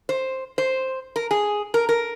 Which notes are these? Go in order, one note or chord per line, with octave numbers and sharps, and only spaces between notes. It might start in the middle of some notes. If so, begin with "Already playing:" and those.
C5
C5
A#4
G#4
A#4
A#4